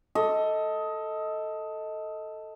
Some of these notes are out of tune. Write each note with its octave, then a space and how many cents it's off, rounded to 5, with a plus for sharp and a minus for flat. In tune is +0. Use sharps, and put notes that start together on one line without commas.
A4 +5 D#5 +20